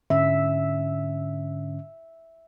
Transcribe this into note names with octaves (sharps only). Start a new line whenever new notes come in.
G#2 D3 C#4 E5